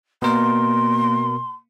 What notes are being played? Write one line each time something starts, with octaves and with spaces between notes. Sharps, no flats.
B2 A#3 A#4 C6